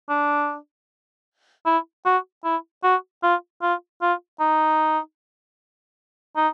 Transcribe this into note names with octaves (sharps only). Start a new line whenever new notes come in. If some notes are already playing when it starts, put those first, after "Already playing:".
D4
E4
F#4
E4
F#4
F4
F4
F4
D#4
D#4